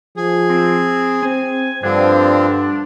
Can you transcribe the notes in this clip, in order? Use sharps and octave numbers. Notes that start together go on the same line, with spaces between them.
F3 G#4
C4
C4 G#5
G2 D3 F3 C4 D4